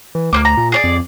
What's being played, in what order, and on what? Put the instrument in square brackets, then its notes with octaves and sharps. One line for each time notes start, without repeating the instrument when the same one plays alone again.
[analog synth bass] E3
[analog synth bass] D2 [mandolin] A#3 C4 D6
[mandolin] A#5
[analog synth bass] A#2
[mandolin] G#4 C#5 D5
[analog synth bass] F2